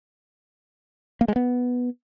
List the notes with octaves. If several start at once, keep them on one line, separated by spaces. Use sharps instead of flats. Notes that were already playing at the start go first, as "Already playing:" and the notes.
A#3
G#3
B3